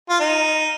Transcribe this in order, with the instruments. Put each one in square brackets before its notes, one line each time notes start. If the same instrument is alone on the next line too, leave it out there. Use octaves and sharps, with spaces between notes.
[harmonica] F4
D#4